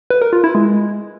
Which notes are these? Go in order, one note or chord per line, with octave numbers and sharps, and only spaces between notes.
B4
A#4
F4
E4
G#3